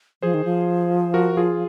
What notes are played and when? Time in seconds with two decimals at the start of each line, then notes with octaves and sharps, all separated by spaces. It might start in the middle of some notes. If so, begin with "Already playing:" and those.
0.22 F3 G#4 C5
0.34 D#3
0.45 F3
1.14 F#4 A#4
1.37 F4 G#4